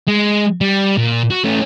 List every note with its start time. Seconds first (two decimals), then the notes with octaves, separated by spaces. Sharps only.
0.08 G#3
0.61 G3
0.97 A#2
1.31 F#4
1.44 A3 C#4